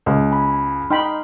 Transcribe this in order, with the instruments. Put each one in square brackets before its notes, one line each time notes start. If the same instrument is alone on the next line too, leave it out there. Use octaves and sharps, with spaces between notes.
[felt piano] C#2
[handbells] G#5 B5
[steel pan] D#4 G5 B5 [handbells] C6 F6